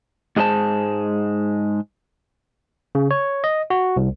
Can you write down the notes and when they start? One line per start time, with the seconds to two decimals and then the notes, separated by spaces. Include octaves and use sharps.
0.36 G#2 G#3 G#4 A4 C5 A5
2.95 C#3
3.11 C#5
3.44 D#5
3.70 F#4
3.96 C2